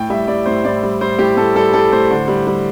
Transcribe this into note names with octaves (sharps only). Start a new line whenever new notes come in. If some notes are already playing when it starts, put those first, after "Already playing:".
Already playing: A2 G5
G3 E5
G3 D5
A2 C5
A2 D5
G3
G3 C5
A2 G4
A2 A4
G3 A4
G3 A4
A2 C5
D3
G3
G3